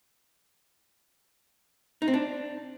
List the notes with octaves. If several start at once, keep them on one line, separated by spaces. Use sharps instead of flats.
D#4
C4
D4